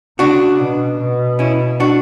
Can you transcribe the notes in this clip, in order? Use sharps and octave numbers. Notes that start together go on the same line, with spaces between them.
C#3 D4 F#4
B2
B2
C#4 E4
D4 F#4